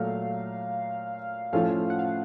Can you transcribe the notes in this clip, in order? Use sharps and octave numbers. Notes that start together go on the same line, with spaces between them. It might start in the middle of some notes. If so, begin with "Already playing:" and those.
Already playing: A#2 F#3 A3 F5
A2 F3 A3 C#4 F4 F5
F#5
F5